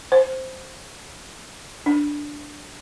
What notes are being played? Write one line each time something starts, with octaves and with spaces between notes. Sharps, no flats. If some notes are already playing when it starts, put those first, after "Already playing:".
C5
D4